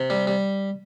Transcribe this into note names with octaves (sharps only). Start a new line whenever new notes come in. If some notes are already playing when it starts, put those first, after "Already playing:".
Already playing: C3
G3
G3